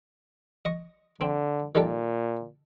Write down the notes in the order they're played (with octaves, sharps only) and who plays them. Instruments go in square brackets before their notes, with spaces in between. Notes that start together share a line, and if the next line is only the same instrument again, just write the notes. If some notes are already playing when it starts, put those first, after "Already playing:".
[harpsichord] D#5 C#6
[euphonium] D3 [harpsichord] C4
[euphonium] A#2 [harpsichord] D#3 G3 A4